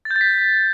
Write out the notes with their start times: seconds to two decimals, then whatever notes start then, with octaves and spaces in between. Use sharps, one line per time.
0.05 A6
0.11 G6
0.16 A6
0.21 B6